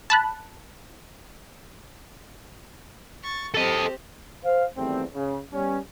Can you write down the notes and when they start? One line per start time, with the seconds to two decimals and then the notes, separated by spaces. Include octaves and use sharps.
0.10 A5 B5 F#6
3.23 C#6 A6
3.54 C4 G4 A4 D#5
4.45 C5 F5
4.77 E2 D#3 G3 A3 C4
5.14 C#3
5.53 G3 B3 C#4